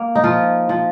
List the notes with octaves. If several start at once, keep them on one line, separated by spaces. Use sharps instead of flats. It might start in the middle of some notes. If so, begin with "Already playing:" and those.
Already playing: A#3
D#4
F3 F4
F3